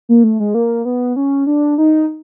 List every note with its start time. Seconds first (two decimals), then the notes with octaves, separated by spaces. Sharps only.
0.09 A#3
0.24 A3
0.40 G#3
0.54 A#3
0.85 B3
1.16 C#4
1.47 D4
1.78 D#4